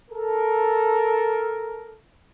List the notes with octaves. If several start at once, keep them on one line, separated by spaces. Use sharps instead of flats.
A4 A#4